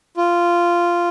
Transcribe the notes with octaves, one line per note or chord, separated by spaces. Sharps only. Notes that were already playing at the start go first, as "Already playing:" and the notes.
F4